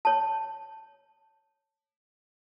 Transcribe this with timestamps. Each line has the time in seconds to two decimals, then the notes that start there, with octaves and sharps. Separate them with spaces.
0.05 C#5 A5